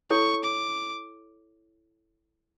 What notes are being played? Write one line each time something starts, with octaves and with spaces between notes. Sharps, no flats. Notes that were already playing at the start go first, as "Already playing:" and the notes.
E4 A4 C#5 C#6
D6